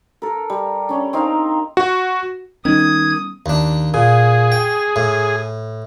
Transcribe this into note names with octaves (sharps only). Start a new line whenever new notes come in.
A4 A#4
G3
C#4 D4
C4 D#4 A#4 F5
F#4
D#3 G3 B3 C#4 D#6 G#6
D#2 D4
A#2 G#4
G5
A2